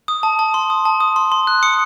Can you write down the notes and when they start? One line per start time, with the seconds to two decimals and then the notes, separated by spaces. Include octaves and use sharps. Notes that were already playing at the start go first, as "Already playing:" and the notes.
0.08 D#6
0.23 A5
0.39 A5
0.54 C6
0.70 D#6
0.85 A5
1.00 D#6
1.16 C6
1.32 C6
1.47 F#6
1.63 D#6 C#7